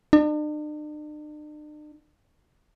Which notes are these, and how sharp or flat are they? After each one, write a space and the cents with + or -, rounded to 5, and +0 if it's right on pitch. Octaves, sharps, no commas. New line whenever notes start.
D4 +45